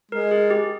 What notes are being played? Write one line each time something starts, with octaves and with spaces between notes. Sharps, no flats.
G#3 A#4
G#4
G4